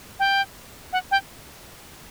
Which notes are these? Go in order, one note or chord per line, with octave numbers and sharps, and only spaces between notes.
G5
F#5
G5